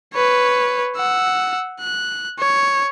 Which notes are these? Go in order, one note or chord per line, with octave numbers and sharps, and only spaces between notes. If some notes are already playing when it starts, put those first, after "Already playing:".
B4 C#5
F#5 E6
F#6
C#5